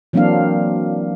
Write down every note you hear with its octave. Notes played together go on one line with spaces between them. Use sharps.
E3 F#3 A#3 C4 D4 F5